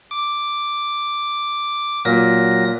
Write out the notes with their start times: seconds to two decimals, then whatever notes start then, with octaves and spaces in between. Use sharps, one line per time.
0.11 D6
2.05 A#2 F#3 A#6